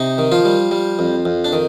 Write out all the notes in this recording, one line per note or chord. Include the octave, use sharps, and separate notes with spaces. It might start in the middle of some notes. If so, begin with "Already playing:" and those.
Already playing: C3 D#4
D#3
F3 F4
G3
G3
F2
F2
D4
D#3